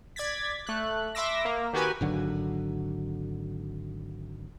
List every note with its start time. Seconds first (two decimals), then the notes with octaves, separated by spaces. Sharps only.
0.16 D5 G#6 A6 B6
0.66 A3 F#6
1.15 E5 B5 C6 D6 E6 A#6
1.45 A#3
1.73 D#3 F#4 G4 B4 G#5
2.01 G#1 D3 F#3